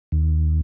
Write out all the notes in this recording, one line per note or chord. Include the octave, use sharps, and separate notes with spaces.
D#2